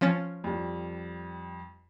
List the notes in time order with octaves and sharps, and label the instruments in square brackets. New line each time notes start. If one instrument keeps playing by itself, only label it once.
[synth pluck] F3 C#4 A6
[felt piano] F2 G3